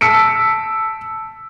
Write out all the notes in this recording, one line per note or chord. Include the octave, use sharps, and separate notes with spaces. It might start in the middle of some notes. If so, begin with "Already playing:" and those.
A5 E6 B6 C#7 D7